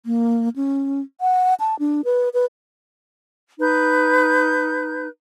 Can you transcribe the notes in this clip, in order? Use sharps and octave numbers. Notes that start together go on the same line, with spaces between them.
A#3
C#4
F#5
A5
D4
B4
B4
D#4 B4 G6